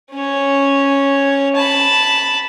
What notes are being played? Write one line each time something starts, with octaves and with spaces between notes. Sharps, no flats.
C#4 C#5
A5 B5